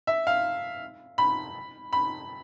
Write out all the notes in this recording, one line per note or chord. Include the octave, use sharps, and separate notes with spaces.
E5
F5
B5
B5